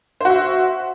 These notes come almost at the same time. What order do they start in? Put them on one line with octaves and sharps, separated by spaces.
C5 F#4 E5